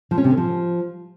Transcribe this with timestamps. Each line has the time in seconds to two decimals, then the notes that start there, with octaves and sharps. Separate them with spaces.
0.11 F3
0.18 C#4
0.24 C3
0.31 D3
0.37 F3